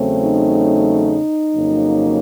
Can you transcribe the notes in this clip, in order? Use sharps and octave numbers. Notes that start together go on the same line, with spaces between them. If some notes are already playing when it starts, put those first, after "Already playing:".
Already playing: E2 C#3 F#3 A3 C4
D#4
F2 C#3 F#3 A#3